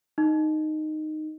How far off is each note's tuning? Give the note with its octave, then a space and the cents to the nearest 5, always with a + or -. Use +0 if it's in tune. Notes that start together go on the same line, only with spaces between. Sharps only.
D#4 -10